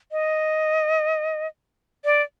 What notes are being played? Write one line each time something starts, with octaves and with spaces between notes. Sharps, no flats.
D#5
D5